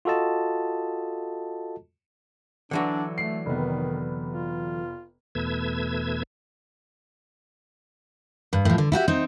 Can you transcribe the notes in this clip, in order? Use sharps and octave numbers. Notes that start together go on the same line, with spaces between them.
F4 F#4 A4 D#5 A5
D3 E3 F#3 D4
A3 C7
F1 D#3 B3
F4
E2 B2 A3 B4 E6 G#6
G2
A2 F3
D3
E4 F#4 G4 E5
C4 D#4